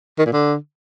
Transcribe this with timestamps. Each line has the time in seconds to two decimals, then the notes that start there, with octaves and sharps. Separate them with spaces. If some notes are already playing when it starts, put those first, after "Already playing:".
0.19 D#3
0.26 A#2
0.33 D3